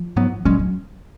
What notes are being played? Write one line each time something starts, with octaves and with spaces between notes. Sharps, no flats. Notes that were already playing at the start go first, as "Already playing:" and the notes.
Already playing: F3
G#2 F#3 B3
A#2 F#3 G#3 C#4
F#3